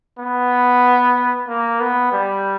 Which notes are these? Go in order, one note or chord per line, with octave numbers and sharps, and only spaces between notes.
B3
A#3
B3
G3